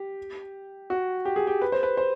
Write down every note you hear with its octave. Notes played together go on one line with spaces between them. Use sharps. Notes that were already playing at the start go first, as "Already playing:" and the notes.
Already playing: G4
F#4
G4
G#4
G4
B4
C5
B4
C5